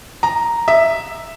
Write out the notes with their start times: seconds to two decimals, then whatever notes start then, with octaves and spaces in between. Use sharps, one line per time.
0.23 A#5
0.68 E5